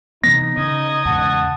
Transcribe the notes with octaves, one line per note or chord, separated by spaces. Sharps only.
C3 E3 B3 D#4 A#6
C#3 D#5 G#6
E2 G#2 C#3 F#5 A5